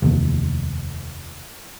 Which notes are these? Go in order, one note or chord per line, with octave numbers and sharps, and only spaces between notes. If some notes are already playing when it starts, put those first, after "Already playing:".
F1 D#2